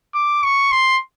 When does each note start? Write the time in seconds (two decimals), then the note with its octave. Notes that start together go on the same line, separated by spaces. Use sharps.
0.14 D6
0.43 C#6
0.71 C6